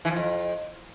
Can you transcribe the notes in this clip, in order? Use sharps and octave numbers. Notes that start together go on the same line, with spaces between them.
E3
F3
F2